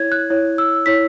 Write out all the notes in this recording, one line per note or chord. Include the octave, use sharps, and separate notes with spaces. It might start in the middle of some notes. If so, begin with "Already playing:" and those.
Already playing: E4 C#5 G#6
F#6
E4 C#5
E6
E4 C#5 B6